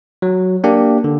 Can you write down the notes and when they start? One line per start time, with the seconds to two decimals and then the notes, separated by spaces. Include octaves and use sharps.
0.22 F#3
0.64 A#3 D4 G4
1.04 D3